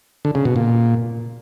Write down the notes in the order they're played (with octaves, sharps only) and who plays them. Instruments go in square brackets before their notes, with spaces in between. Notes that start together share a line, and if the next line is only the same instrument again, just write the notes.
[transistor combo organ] D3
C#3
B2
A#2